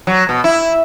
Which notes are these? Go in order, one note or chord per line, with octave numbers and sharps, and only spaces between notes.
F#3
B2
E4